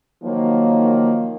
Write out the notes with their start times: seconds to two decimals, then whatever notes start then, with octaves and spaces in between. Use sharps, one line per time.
0.24 D#3 F3 F#3 A#3